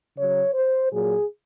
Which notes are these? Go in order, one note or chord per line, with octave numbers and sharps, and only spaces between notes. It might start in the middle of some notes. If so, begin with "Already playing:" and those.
C#3 F#3 C#5
C5
A#2 F#3 G#4